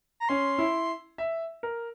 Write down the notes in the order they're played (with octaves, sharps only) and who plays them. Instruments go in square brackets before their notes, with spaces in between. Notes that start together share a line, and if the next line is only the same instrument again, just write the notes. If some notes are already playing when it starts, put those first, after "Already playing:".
[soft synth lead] A#5
[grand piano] C#4 [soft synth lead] C6
[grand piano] E4
E5
A#4